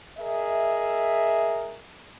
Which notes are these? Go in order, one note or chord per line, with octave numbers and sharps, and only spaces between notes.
G#4 A#4 D#5 E5